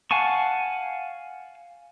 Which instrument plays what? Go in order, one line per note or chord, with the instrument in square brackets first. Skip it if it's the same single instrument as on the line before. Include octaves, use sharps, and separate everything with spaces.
[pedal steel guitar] F5 F#5 G#5 A5 C#6